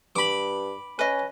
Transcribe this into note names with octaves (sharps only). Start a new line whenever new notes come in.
G2 B5 D6
C#4 B4 D#5